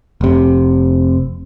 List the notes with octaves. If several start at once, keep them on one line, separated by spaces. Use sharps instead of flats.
F1 C3